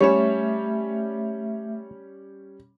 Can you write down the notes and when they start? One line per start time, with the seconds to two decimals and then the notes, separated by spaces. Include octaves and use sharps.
0.01 G3 A3 C#4 C#5 E5